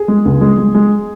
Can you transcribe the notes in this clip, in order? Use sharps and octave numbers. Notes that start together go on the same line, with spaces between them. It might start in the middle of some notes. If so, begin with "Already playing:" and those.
Already playing: G#4
G#3
C#2
G#3
G#3
G#3